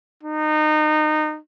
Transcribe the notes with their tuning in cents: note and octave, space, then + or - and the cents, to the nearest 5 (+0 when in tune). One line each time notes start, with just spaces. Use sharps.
D#4 -25